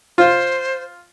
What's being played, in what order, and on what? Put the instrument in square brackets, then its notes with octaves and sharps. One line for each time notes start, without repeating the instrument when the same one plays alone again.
[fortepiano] F4 [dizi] C5